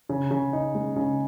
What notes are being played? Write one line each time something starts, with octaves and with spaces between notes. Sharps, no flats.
C#3
C#3
D#4
G#3
C#3